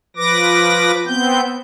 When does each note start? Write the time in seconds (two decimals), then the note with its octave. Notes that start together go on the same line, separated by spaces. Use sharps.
0.16 F3 B4 D6 A#6
1.06 B3 C4 G6